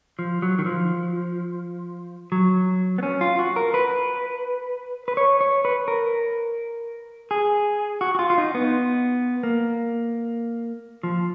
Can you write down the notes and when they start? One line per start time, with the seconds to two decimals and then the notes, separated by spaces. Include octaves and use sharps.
0.19 F3
0.42 F#3
0.58 D#3
0.66 F3
2.32 F#3
2.98 B3
3.03 C#4
3.21 F4
3.39 F#4
3.56 A#4
3.74 B4
5.08 B4
5.17 C#5
5.41 C#5
5.65 B4
5.88 A#4
7.31 G#4
8.01 F#4
8.15 F#4
8.19 F4
8.30 F4
8.38 D#4
8.55 B3
9.43 A#3
11.03 F3